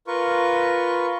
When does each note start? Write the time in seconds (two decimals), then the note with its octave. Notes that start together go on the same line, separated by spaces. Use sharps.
0.07 F4 A#4 B4 C#6